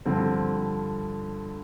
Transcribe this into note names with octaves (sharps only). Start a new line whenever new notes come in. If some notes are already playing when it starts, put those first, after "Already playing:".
G2 D3 F3 C4